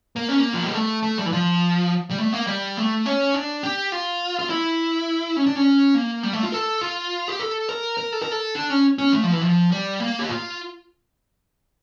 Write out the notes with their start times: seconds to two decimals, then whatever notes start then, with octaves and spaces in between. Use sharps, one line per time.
0.16 A#3
0.29 C#4
0.40 A#3
0.54 F3
0.64 G3
0.73 A3
1.03 A3
1.18 G3
1.26 E3
1.32 F3
2.10 G3
2.18 A3
2.33 A#3
2.47 G3
2.77 A3
3.06 C#4
3.34 D4
3.63 G4
3.92 F4
4.39 F4
4.50 E4
5.37 C#4
5.46 D4
5.56 C#4
5.95 A#3
6.23 G3
6.33 A3
6.43 F4
6.52 A4
6.81 F4
7.28 G4
7.40 A4
7.69 A#4
7.97 A#4
8.12 A4
8.22 A#4
8.31 A4
8.55 D4
8.70 C#4
8.98 C#4
9.13 A3
9.23 F3
9.32 E3
9.42 F3
9.72 G3
10.00 A#3
10.19 G4
10.29 F4